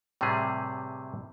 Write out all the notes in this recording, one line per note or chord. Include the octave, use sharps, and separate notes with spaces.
A2 C3 E3 G3 G#4